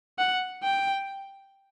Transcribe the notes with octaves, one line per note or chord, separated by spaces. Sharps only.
F#5
G5